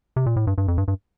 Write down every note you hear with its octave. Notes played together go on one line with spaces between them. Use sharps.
C3
A#2
A2
G2
G2
F2
G2
G2